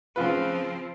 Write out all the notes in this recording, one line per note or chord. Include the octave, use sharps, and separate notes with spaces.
C#3 F3 C4 F4 B4